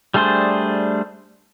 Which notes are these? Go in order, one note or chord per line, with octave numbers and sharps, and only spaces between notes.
G3 A3 D4 G#4 C5